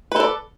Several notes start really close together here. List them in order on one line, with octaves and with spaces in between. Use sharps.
B4 A4 D5